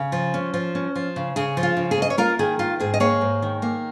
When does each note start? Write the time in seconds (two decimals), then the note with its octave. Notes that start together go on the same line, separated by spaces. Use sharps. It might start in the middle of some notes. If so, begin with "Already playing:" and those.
Already playing: C#3
0.12 F3
0.34 C#4
0.54 F3
0.75 C#4
0.96 F3
1.16 C#3
1.36 C#3 G#4
1.57 F3
1.63 F4
1.77 C#3
1.91 G#4
1.98 C#4 D#5
2.10 C#5
2.18 A#3 F4 A#4
2.39 D#3 G#4
2.59 D#3 F4
2.80 G#2 G#4
2.94 D#5
3.00 A#3 G#4 C#5
3.21 G#2
3.42 D#3
3.62 A#3